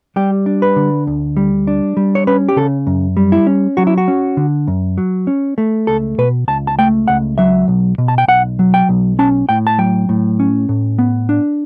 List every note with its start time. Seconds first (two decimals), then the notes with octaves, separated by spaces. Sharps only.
0.16 G3 G4
0.46 D4
0.62 B4
0.76 D3
1.07 D2
1.37 G3
1.67 D4
1.97 G3
2.15 C#5
2.27 C#4 B4
2.49 G4
2.57 C#3 A4
2.87 F#2
3.17 G3
3.32 E4
3.47 C#4
3.77 F#3 F#4
3.87 E4
3.98 F#4
4.08 C#4
4.37 D3
4.67 F#2
4.98 F#3
5.27 C#4
5.58 A3
5.87 C#2 A4
6.18 B2 B4
6.48 C#2 A5
6.67 A5
6.79 A3 G5
7.08 C#2 F#5
7.38 F#3 E5
7.68 B1
7.98 B2
8.08 A5
8.18 G5
8.28 B1 F#5
8.59 F#3
8.74 G5
8.89 B1
9.19 C#4 A5
9.49 A2 G5
9.67 A5
9.78 F#3 G5
10.09 A2
10.40 C#4
10.69 A2
10.99 B3
11.29 D4